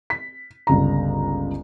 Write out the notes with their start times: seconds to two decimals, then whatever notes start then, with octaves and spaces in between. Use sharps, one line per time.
0.10 B6
0.67 G1 C#2 A#5